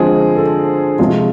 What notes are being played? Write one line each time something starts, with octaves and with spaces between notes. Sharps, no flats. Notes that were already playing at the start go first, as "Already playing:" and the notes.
Already playing: D3 F3 G#3 C4 G#4
A4
C3 F3 G#3 F4